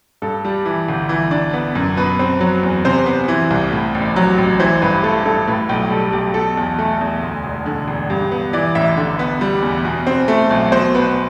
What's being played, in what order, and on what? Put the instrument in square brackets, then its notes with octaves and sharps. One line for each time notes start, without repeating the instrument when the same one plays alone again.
[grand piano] G2 A4
G3
E3
G1
E3
D4
B3
F#2
B2 B4
C4
F#3
E2
C3 C5
B3
E3
C2
A2
A1
F#3
A1
E3 C5
G2 B4
A3 A4
G2 A4
A2 B4
B1 G5
G3 A4
B1 G4
B2 A4
E2
A3
E2
D2
E1
D3
E1
G2 G4
B3
E3 D5
A1 E5
D3
B3
G3
E2
B2
C4
A3
B1
B2 C5
B3 B4